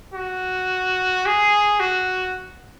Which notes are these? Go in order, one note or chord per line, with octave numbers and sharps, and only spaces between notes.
F#4
G#4
F#4